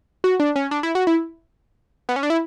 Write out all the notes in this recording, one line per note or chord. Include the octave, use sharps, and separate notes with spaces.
F#4
D4
C#4
D4
E4
F#4
E4
B3
C#4
D4
E4